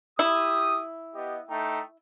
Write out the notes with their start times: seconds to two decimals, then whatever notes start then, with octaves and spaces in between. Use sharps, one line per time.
0.19 E4 G4 D#6
1.15 B3 G4 D#5
1.48 A3 D#4 G5